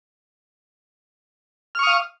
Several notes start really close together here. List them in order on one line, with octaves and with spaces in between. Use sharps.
F6 C#6 D#6 F5